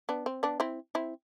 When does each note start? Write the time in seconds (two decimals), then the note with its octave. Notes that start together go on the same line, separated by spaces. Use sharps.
0.09 B3 D4
0.26 C4
0.43 B3 D4
0.60 C4 E4
0.95 C4 E4